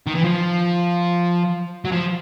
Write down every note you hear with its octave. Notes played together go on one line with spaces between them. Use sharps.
D#3
E3
F3
F#3
F3